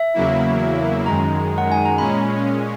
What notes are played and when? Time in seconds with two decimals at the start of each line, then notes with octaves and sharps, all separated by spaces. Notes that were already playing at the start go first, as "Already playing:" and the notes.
Already playing: E5
0.14 E2 C#3 F#3 A#3 E4
1.06 F#2 D#3 G#3 A#5
1.58 F#5
1.72 G#5
1.85 A#5
1.98 A#2 G#3 C#4 B5